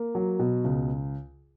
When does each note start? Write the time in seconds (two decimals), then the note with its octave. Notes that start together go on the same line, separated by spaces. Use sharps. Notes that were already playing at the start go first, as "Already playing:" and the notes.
Already playing: A#3
0.15 F#3
0.39 B2
0.64 C#2